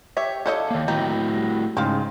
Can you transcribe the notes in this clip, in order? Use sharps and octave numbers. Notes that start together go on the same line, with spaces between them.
G4 C#5 E5
D3 E4 A4 C#5 D#5 F5 D6 G6
D#3 A#3
A3 D#4 E4 F#4 G5
G3 A#6
G#2 C#3 C4 F5 F6